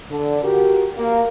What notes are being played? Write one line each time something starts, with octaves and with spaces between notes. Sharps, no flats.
D3
F#4 G4 A#4
A#3